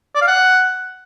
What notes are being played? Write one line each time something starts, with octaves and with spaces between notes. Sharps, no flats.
D5
F5
F#5